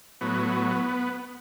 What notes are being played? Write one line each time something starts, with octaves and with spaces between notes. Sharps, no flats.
A2 F#3 B3